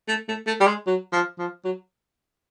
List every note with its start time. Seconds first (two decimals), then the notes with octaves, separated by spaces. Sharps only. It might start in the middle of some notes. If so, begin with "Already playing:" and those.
0.08 A3
0.28 A3
0.47 A3
0.60 G3
0.67 G#3
0.86 F#3
1.12 F3
1.38 F3
1.65 F#3